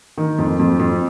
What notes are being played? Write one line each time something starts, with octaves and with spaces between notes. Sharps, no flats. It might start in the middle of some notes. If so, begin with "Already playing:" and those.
D#3
F2
F2
F2